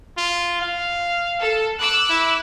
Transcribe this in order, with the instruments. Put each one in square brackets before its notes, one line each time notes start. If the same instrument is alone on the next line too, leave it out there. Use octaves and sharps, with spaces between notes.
[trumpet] F4
F5
[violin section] A4
D6 E6 F#6
[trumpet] E4